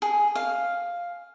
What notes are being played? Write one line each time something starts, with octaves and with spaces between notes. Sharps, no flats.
G#4
F5